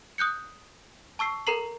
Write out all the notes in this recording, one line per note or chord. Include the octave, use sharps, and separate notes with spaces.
D#6 F#6 G6 C#7
A5 C#6 E6 C7
A4 A#4 A#5 C7 F#7